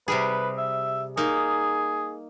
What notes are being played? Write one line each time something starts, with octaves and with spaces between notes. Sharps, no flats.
C3 G3 G#4 B4
E5
A#3 D#4 G#4